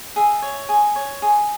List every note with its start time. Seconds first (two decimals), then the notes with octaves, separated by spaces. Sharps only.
0.16 G#4 E5
0.42 C#5
0.69 G#4
0.96 C#5
1.22 G#4